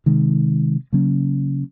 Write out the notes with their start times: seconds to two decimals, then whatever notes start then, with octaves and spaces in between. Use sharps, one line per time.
0.06 C3 D#3 G#3
0.92 C#3 F#3 A#3 C#4